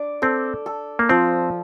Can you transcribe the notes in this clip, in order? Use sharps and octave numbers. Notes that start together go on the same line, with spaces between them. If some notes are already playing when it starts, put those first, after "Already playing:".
Already playing: D4 D5
C4 A4
A4
A#3
F3 C4